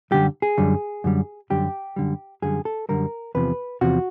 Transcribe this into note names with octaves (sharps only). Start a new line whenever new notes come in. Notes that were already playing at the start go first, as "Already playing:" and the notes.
F#2 D3 G3 G4
G#4
F#2 D3 G3
F#2 D3 G3
F#2 D3 G3 G4
F#2 D3 G3
F#2 D3 G3 G#4
A4
F#2 D3 G3 A#4
E2 C3 F3 B4
E2 C3 F3 F#4